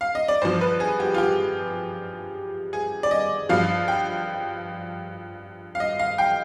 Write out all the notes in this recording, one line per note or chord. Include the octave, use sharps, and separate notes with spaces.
F5
D#5
D5
G2 F3 C5
B4
G#4
G4
F4
G4
G#4
D5
D#5
G2 F3 F5
G5
F5
D#5
F5
G5